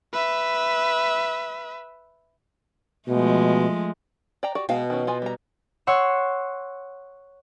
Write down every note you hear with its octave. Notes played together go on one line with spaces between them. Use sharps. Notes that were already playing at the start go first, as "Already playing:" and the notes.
B4 E5
B2 F3 G#3 A3
D5 G5 A#5
F#4 G4 D5
B2 G#3 F5 G5
D#3 C#4
B3 F4 G#5
G3 A#5
C#5 F#5 C6 E6